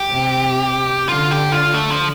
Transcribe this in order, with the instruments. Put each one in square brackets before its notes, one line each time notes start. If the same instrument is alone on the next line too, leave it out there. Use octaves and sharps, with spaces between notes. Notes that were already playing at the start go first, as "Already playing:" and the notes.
Already playing: [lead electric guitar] G4
[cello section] C3
[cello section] D3 [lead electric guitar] F4
[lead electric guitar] G4
F4
A3
F3